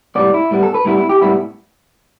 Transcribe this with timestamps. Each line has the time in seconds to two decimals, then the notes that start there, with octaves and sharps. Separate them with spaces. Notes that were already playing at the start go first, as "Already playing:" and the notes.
0.15 A2 G3 B3 D5
0.34 E4
0.51 A2 G3 B3
0.63 A4
0.74 B4
0.85 A2 G3 B3 E4
0.98 E4
1.09 G4
1.21 A2 G3 B3 E4